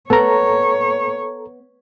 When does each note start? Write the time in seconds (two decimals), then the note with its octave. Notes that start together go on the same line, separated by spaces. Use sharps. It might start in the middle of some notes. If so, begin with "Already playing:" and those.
0.10 B3 A4 C#5 A#5